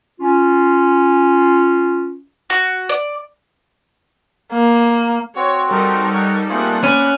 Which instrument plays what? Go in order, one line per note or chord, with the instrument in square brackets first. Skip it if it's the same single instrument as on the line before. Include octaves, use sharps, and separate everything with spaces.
[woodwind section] C#4 F4
[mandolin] F#4
D5
[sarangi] A#3
[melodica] C4 F#4 [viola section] C#5
[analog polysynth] G3 D#4 A4 [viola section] A#4
[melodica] C#5 F#5 C#6
[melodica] A3 F4 G#4 [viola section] A#3 C4 F#5
[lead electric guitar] C#4 [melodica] D5 B5